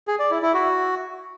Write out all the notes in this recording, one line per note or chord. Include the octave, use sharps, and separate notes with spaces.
G#4
D5
E4
E4
F#4